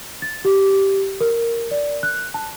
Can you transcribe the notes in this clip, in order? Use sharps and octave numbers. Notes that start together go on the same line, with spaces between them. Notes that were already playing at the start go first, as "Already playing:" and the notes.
A6
G4
A#4
D5
F#6
A5